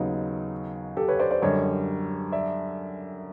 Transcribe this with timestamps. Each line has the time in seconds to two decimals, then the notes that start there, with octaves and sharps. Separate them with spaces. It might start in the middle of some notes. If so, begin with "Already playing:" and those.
Already playing: D#2 C#3 F#3 B3 D#4
0.97 G4 A4
1.08 B4 C#5
1.20 C5 D5
1.31 C5 D5
1.42 F#2 D3 G3 C#5 D#5
2.32 D5 E5